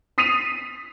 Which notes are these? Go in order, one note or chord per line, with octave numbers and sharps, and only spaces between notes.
D#6 B6 C7 D#7 F7